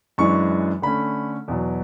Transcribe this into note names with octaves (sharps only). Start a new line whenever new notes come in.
F#2 E3 G#3 D4 C#6
D3 A3 C#4 B5
E2 B2 F#3